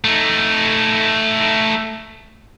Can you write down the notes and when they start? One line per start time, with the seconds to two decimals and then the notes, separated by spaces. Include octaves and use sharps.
0.05 A3 D#4